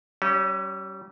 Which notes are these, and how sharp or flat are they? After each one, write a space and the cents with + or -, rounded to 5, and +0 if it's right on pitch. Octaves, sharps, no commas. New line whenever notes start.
G3 -35 C#4 +0